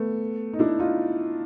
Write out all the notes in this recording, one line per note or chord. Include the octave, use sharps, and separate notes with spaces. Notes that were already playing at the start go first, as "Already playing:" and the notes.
Already playing: A3 B3
D#4
D4 E4
D#4 F4